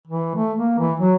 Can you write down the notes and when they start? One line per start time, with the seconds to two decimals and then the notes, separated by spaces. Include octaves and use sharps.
0.08 E3
0.35 A3
0.59 A#3
0.79 E3
1.00 F#3